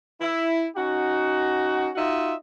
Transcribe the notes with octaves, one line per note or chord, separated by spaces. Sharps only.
E4
C#4 D#4 F#4
D#4 F4 F#4 D#5 E5